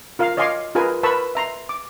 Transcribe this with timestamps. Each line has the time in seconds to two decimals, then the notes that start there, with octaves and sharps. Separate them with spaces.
0.19 F4 A#4 F5
0.37 C#5 D#5 F5 G#5 C6 D6
0.75 F4 G#4 A#4 B4 G#5
1.03 A#4 B4 A5 B5 C#6 E6
1.35 E5 A#5 C6
1.69 D6